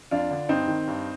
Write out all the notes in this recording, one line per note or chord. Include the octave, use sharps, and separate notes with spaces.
F2 D4 F4
D3
G2 C4 D#4
D#3
G2